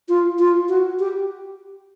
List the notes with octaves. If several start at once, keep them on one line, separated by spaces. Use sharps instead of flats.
F4
F4
F#4
G4